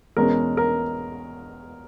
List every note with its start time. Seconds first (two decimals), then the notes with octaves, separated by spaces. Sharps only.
0.16 E2 B2 G#3 C#4 A#4
0.57 A#4